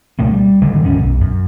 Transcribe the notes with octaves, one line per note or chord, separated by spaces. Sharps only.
C#2 B2 A3 A#3
G3
D1 D3 D#3 G#3
E1 A1 F#2 C#4
B1
F#2